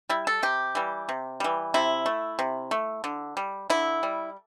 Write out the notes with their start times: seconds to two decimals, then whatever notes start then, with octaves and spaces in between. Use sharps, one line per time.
0.09 G3 E4
0.27 A4
0.43 C3 G4
0.75 E3 G3
1.09 C3
1.40 E3 G3
1.74 C3 E4
2.06 A3
2.39 C3
2.71 A3
3.04 D3
3.37 G3
3.70 D3 E4
4.03 G3